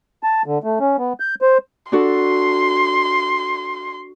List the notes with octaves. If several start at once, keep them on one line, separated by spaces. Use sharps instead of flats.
A5
D3
A3
C#4
B3
G6
C5
D4 F#4 A4 C6